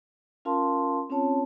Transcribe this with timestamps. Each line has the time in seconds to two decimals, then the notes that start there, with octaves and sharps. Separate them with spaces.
0.45 C#4 F4 A#4 F5 A5 C6
1.10 C4 C#4 F4 C#5 A5